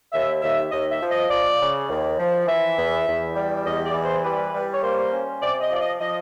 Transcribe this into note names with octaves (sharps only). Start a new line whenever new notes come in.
D#2 E5
D#2 E5
D#2 D#5
E5
F3
D#5
F3 D5
C#3
D#2
F3
E3 E5
E2
E2
G3
E2 D#5
D5
E3
C5
G3 B4
G3
C#5
A#3 C5
C#4
C3 D5
D#5
F3 D5
D#5
F3 D#5